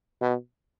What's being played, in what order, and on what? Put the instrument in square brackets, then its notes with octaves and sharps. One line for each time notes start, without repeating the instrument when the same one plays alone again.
[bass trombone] B2